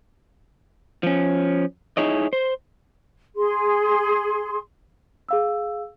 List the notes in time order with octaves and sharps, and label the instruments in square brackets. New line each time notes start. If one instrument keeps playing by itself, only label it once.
[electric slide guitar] F3 C#4
D#4 E4 G#4 C#5 D#5
C5
[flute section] G#4 C6
[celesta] G#4 F5 E6